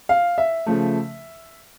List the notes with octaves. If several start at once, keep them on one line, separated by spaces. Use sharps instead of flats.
F5
E5
C#3 F3 A3